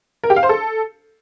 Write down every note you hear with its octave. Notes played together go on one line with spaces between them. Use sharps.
A#4
G4
F5
C5
A4